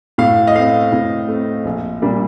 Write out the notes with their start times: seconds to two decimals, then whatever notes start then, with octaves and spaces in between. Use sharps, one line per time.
0.18 A2 F5
0.47 D#5
0.55 A3 C4 F5
0.92 A2
1.28 A3 C4
1.65 A#1
2.02 A#2 G3 A#3 D4